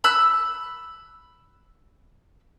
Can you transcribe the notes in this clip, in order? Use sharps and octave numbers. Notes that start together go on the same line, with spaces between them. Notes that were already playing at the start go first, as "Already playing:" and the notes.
B5 E6 F#6